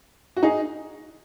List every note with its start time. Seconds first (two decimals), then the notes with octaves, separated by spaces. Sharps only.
0.36 F#4
0.43 D#4 G#4